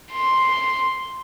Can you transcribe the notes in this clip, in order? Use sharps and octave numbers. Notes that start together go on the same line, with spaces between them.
C6